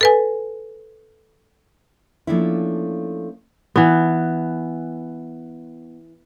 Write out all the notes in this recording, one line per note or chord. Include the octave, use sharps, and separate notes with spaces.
A4 B4 G#5
F3 A3 A#3 C#4 D4 E4
E3 B3